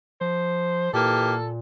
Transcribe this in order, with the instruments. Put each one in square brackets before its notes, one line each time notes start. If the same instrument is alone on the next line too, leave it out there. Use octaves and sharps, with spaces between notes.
[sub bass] F3 [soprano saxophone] C5
[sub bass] A#2 [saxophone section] E3 A#3 G4 [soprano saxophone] A4